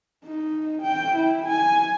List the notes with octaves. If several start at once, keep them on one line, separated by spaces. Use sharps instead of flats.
D#4
G5
E4
G#5